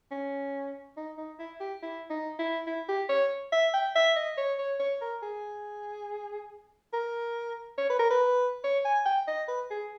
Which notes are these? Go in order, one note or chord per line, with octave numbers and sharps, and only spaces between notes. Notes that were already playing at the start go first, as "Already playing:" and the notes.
C#4
D#4
D#4
E4
G4
E4
D#4
E4
E4
G4
C#5
E5
G5
E5
D#5
C#5
C#5
C#5
A#4
G#4
A#4
C#5
B4
A#4
B4
C#5
G#5
G5
D#5
B4
G#4